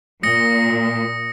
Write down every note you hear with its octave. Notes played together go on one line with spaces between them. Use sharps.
A#2 D#6 A#6 C#7